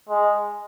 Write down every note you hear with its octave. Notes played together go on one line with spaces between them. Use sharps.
G#3